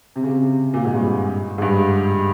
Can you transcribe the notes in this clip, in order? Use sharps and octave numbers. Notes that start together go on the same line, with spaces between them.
C3
C#3
C3
A#2
G#2
G2
G#2
G2